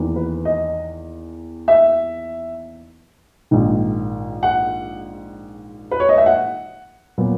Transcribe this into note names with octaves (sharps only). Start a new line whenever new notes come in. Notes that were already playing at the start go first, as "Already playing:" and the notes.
Already playing: E2 D#3 A#3
B4
D#5
E5
A#1 G#2 D#3
F#5
B4
C#5
D#5
E5
F#5
A#2 F#3 B3